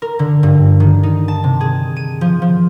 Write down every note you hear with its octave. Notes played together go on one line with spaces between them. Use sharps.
A#4
D3
G2
D#3
D#4
A5
C3
G#4
D#7
F3
F3